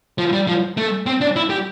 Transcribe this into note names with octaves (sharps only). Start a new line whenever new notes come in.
F3
G3
F3
A3
C4
D4
E4
G4